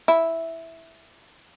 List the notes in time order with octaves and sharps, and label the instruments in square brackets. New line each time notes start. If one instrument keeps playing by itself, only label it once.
[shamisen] E4